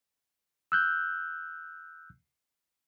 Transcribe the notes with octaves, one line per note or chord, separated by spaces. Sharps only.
E6 F#6 G6